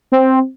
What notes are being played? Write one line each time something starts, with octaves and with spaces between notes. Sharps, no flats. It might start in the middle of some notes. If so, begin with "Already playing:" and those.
C4